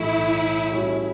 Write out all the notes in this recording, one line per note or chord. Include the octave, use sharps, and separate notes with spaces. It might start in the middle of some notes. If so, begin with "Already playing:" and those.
Already playing: B1 A2 E3 A3 E4
A2 G3 C#4 F#4